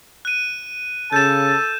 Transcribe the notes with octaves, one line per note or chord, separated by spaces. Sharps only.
F#6 D#7
C#3 A4 A5 G6 E7